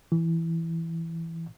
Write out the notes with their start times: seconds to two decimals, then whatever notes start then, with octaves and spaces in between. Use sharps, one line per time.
0.12 E3